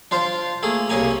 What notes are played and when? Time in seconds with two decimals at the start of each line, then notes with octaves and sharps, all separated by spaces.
0.11 D4 F4 C5 F5
0.63 A3 A#3 G#4
0.89 C2 C#3 A#3 G#5 A#5